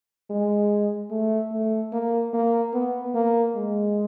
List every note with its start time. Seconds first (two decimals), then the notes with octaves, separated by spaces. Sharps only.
0.30 G#3
1.11 A3
1.52 A3
1.92 A#3
2.33 A#3
2.74 B3
3.15 A#3
3.55 G#3